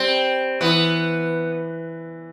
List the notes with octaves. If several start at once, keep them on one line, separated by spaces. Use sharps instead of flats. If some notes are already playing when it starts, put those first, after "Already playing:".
Already playing: G3 C4
E3 B3